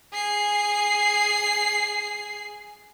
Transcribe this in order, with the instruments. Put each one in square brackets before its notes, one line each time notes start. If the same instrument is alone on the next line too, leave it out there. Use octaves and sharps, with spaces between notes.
[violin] G#4 C7